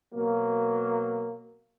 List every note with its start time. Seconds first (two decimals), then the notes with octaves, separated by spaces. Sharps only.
0.13 B2 F#3 A#3